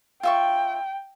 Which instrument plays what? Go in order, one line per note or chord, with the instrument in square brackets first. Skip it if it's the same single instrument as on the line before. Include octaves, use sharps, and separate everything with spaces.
[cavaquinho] F4 E5 C#6 [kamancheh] G5